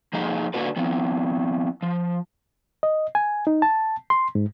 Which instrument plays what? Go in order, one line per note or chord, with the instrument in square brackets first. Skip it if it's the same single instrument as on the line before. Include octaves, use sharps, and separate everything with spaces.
[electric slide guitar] F3 A#3 D#4 G#4 D#5 A#5
D3 A#3 D4 D#4 F#4 B4
F3 B3 C4
F3
[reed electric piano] D#5
G#5
D#4
A5
C6
G#2